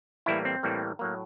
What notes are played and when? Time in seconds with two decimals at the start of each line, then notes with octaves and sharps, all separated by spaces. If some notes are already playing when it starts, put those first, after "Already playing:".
0.26 A2 E3 G3 A#3 E4
0.45 C4
0.63 A2 E3 G3 A#3
0.99 A2 F#3 A#3